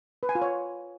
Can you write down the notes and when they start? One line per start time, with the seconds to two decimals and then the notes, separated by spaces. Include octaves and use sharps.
0.23 B4
0.29 G#5
0.35 F4
0.42 C#5